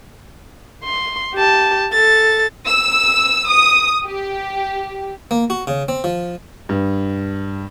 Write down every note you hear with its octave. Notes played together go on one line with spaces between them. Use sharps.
C6
G4 A5
A4 A6
E6
D#6
G4
A#3
F#4
C#3
C4
F3
G2